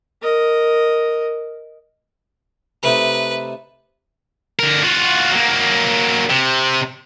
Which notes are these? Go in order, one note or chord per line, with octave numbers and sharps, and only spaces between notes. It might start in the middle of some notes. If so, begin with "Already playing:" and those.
A#4 D#5
C3 A3 D#4 B4
D3 A#4
F4 F#4
F#3 A#3
C3